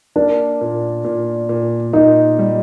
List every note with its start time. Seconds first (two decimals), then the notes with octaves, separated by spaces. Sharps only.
0.16 A#3 D4
0.61 A#2
1.04 A#2
1.49 A#2
1.93 A#2 D#4
2.39 G3